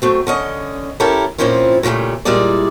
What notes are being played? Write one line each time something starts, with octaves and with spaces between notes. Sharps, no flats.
F#3 A3 C4
D3 C#4 D#5
C#4 E4 G4 A4 A#4
A#2 F3 C4 C#4 E4 F4
A#2 C#3 E3 G3 A3
A#2 G3 G#3 E4 G#4 D5